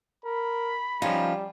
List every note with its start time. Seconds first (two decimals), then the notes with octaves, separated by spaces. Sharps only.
0.25 A#4 B5
1.02 F3 G3 C#4 D#4 F4